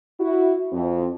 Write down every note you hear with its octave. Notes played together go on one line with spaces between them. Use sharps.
E4 F#4
F2 C4